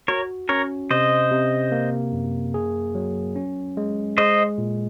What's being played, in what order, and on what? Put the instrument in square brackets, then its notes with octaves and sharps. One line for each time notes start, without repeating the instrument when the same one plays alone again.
[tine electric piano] F#4 [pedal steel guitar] A#4 C#5
[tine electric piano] C#4 [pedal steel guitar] A#4 C#5
[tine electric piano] C3 [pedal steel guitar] C5 D#5
[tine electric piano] C3
A#3
F#2
G#4
F#3
C#4
G#3
[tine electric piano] G#3 [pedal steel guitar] C5 D#5
[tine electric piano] A#2